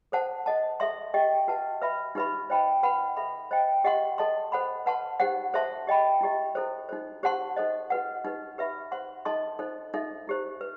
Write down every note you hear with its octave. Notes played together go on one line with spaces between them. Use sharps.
A4 C5 F#5 A5
A4 D#5 F#5 A5
A4 E5 A5 C6
G4 D#5 G5
F#4 B4 F#5 A5
B4 E5 B5
D#4 G4 B4 E5 B5
C5 D#5 G5 B5
B4 F#5 B5
A4 E5 B5
C5 D#5 G5
G4 D#5 F#5 C6
A4 D#5 A5 C6
A4 C5 F#5 B5
B4 F#5 A5 C6
D#4 G4 C5 F#5
A4 C5 E5 A5 C6
G4 D#5 G5 B5
E4 G4 D#5
E4 A4 C5
D#4 F#4 A4 C5
G4 C5 F#5 A5 C6
D#4 A4 C5 D#5
F#4 B4 F#5
D#4 G4 B4
G4 B4 E5 B5
C5 F#5 C6
D#4 A4 D#5 A5 C6
D#4 A4 C5
D#4 A4 E5
E4 G4 C5
B4